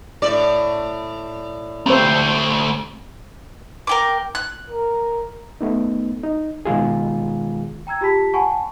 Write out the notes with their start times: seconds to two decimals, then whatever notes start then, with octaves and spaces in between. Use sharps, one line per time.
0.22 A2 D5
1.86 D2 A3 C4 C5
3.87 A#4 G5 D6
4.35 F#6
4.70 A#4
5.61 A3 B3 D#4
6.24 D#4
6.65 B2 D#3 G#3 F4 G#4
7.87 G5 A#5 E6 G#6
8.01 F4 G4 G#4 A5 B5 B6
8.34 F#5 G#5 A5 B5 C#6